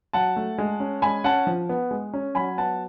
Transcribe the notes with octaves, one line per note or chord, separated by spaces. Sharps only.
F#3 F#5 A5
A3
G#3
C#4
G#3 G#5 B5
C#4 F#5 A5
F3
B3
G#3
C#4
F#3 G#5 B5
B3 F#5 A5